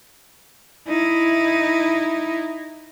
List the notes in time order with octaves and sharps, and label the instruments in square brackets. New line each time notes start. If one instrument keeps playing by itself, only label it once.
[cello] D#4 E4